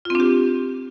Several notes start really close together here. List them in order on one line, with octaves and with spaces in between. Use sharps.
F4 C4 D4 G4